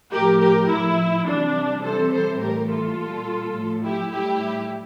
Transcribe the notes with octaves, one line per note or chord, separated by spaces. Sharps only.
A2 F3 G4 A#4
G4 A#4
A2 F3 E4
C3 E3 G3 D4
C3 E3 G3 A4 C5
A4 C5
A2 E3 G3 G4 A#4
F4 A4
A#2 G3
A2 F3
E4 G4
A2 G3 E4 G4